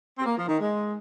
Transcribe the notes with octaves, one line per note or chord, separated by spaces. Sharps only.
C4
A#3
F3
D#3
G#3